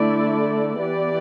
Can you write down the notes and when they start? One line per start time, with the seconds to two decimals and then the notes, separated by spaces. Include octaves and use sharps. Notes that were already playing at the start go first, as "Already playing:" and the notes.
Already playing: D3 A3 E4 A4 D5
0.82 E3 B3 G4 D5